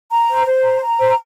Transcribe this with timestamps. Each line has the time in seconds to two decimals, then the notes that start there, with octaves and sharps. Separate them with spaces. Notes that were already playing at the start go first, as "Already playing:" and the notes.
0.11 A#5
0.29 C5
0.46 C5
0.64 A#5
0.81 A#5
0.99 C5